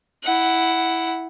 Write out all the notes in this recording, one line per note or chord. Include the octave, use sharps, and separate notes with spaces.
E4 F#5